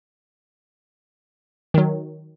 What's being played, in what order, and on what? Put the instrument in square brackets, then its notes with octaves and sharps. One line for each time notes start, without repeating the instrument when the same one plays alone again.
[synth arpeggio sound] D#3 F#3